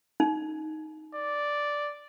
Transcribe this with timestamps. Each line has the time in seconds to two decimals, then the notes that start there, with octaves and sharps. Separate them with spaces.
0.20 D#4
1.15 D5